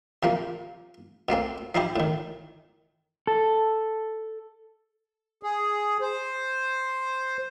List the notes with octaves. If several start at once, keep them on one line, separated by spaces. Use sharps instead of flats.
C3 F3 A#3
B2 A3 A#3 C4
F3 D#4 E4 G4
A2 D#3
A4
G#4
C5